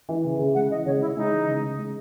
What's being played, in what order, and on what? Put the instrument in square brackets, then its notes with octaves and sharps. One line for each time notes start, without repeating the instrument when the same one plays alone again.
[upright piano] E3
C#3
C#3
[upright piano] G#3 [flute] F#5
[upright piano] E3 [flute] D#5
[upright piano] C#3 [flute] C#5
[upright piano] C#3 [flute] E4
[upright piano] G#3 [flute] D#4
[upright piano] E3
C#3
C#3
G#3